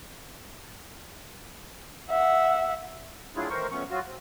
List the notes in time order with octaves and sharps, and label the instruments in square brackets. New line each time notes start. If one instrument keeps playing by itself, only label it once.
[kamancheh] E5 F#5
[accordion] F#3 A3 D4 E4 F4 G#4
D#3 E3 A3 A#4 C5 C#6
F2 F3 A3 B3 C#4 C#6
F#3 F4 F#4
C4